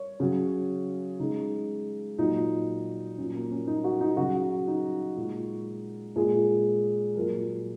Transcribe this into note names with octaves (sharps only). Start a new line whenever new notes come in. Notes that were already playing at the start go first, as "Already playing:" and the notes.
Already playing: C#5
C#3 F#3
C#3 G#3 D#4
A#2 F#3 D#4
A#2 F#3 C#4
A#3
C#4
D#4
F#4
D#4
C#3 F#3 F#4
D#4
A#2 G#3
A#2 G#3 G#4
A#2 F#3 A#4